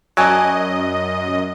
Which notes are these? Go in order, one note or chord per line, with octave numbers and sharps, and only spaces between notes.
F#2 F#3 D5 D#5 G#5 A5